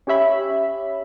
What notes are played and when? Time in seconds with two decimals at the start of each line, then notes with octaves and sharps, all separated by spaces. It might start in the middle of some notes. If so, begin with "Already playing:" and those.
0.07 C#4 G4 C#5 E5 B5